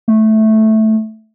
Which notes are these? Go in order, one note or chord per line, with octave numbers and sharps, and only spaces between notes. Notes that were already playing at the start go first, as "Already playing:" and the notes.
A3